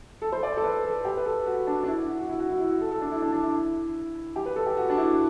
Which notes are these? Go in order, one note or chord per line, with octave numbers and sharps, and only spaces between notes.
A4
C5
D5
A4
B4
A4
G4
B4
A4
F#4
D4
D4
E4
F#4
F#4
E4
F#4
E4
E4
F#4
A4
A4
D4
E4
D4
D4
E4
G4
B4
A4
G4
F#4
D4
E4